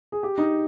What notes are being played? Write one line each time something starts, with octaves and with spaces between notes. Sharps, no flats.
G#4
G4
D#4